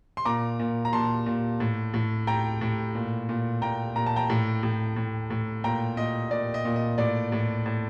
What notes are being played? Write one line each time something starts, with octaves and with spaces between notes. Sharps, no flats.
C6
A#2 A#5 D6
A#2
A#5
A#2 A5 C6
A#2
A2
A2
A2 G5 A#5
A2
A#2
A#2
A#2 G5 A#5
A#2 A#5
A5
G5 A#5
A2
A2
A2
A2
A#2 G5 A#5
A#2 D#5
A#2 D5
D#5
A#2
D#5
A2 D5
A2
A2